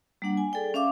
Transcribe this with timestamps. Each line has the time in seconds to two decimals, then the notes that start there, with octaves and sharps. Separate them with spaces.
0.22 G3 A#3 D4 F#5
0.37 G#5
0.53 G#4 A4 D5 G5
0.74 C#4 E5 F5 D6